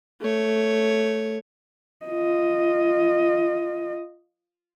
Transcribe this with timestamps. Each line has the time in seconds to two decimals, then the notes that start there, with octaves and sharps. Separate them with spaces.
0.21 A3 C#5
2.06 F4 D#5